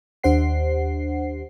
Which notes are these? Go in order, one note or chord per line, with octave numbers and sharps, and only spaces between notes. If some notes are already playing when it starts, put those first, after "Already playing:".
D#2 D4 G4 C5 F#5 C7